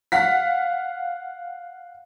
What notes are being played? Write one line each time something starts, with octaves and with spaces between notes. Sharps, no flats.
F5 F#5 B6